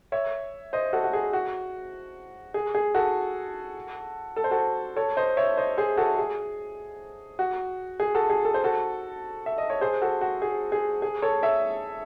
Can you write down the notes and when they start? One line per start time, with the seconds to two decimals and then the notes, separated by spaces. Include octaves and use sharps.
0.12 C#5 E5
0.73 C5 D#5
0.93 F#4 A4
1.04 F#4
1.13 G#4
1.33 F#4
2.54 G#4
2.75 G#4
2.95 F#4 A4
4.36 A4
4.44 C5
4.51 F#4 A4
4.96 A4 C#5
5.17 C5 D#5
5.37 C#5 E5
5.57 C5 D#5
5.77 G#4 C5
5.97 F#4 A4
6.18 G#4
7.39 F#4
8.00 G#4
8.15 F#4 A4
8.30 G#4
8.45 A4
8.54 C5
8.64 F#4 A4
9.46 E5
9.58 D#5
9.70 C#5
9.81 G#4 C5
10.02 F#4 A4
10.21 F#4
10.42 G#4
10.72 G#4
11.02 G#4
11.22 A4 C#5
11.43 C#5 E5